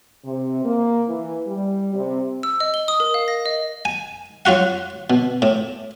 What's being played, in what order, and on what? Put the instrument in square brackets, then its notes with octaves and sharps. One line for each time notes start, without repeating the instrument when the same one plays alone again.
[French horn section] C3
A#3
E3
G3
C3
[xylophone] E6
D#5
G7
D#6
A#4
F5
A#6
D#5
[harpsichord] G#5
F#3 F4 F#4 F#5
B2
A2